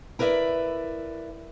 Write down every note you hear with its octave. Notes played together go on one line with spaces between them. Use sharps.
E4 A#4 B4 D5 E5